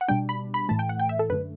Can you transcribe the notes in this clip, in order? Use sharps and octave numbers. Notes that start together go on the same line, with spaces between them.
F#5
B2 G3 D4 G5
B5
B5
A2 E3 A3 A5
G5
F#5
G5
E5
A4
F#2 D3 A3 B4